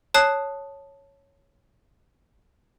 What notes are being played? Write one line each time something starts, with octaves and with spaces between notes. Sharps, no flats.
C#5 A5 D#6 F#6 C7